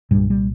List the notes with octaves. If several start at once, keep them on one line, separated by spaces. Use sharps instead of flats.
C2 G2 A#2 G3
G3